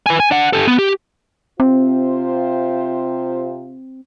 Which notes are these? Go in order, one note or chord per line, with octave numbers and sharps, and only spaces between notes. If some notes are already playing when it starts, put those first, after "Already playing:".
B4 G#5
G#5
D4 F#5
G4 A4
B3
G4
C3 C4 F4 C5